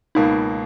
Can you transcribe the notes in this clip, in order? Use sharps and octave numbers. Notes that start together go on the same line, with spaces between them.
C#2 B2 A#3 D#4